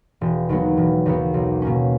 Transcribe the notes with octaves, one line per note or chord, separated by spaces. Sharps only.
E1
D#2 D#3 F#3 B3
E1
D#2 D#3 F#3 B3
B1
B2 A#3 C#4